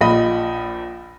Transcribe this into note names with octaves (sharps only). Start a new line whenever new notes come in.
A#1 A#2 D#5 B5